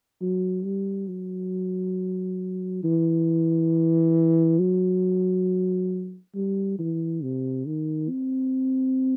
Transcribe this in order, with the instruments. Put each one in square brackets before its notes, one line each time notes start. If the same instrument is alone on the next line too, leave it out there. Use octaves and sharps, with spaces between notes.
[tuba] F#3
G3
F#3
E3
F#3
G3
E3
C3
D#3
C4